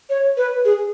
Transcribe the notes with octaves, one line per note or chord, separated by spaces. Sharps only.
C#5
B4
G#4